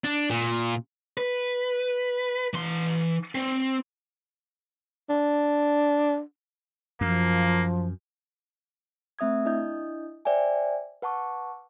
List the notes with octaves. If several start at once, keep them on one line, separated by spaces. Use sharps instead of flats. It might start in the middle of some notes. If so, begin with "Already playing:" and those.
D4
A#2
B4
E3 C6
C4
D4
F#2 F3 A#3
A3 C4 E5 D#6 G#6
D4 E4 D#5 D#6 G6
C5 D5 E5 G5 G#5
B4 F#5 A5 C#6 D6